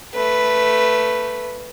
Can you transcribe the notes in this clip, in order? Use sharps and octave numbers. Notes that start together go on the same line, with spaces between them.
A3 B4